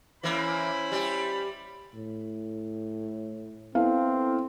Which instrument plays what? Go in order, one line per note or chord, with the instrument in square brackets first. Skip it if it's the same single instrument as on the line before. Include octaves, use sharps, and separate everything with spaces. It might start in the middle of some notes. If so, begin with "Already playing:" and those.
[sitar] E3 A#3 [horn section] C#4 E4 C5 [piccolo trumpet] B5
[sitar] G3 G4
[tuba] A2
[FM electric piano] B3 E4 A4 [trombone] C4 [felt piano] F5